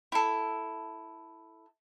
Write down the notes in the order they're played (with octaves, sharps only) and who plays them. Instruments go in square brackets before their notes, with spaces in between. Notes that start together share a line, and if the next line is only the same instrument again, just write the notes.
[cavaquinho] E4 A4